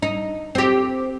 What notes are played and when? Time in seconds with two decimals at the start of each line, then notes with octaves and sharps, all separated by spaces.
0.02 D#4
0.55 C4 G4